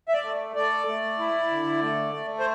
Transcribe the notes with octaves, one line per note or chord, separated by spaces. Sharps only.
E5
D5
A3
A3 D5
A3
E4
D3
A3
A3
C5